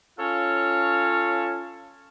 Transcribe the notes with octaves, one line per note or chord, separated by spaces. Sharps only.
C#4 F4 A4 C#5 F5